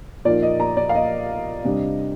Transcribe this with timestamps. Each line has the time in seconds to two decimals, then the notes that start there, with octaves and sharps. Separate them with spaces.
0.25 A#2 F3 A#3 D#4 D5
0.42 D#5
0.60 A#5
0.77 D5
0.89 F5
0.95 D#5
1.64 C3 G3 D4